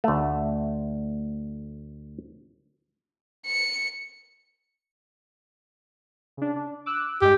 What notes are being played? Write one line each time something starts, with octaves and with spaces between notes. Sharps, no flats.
D2 A3
C#7
C#3 D4
D4
D6 E6 F#6
G2 G#3 G4